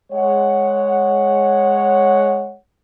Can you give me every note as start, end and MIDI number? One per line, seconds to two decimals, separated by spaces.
0.12 2.56 56
0.12 2.56 73
0.12 2.56 78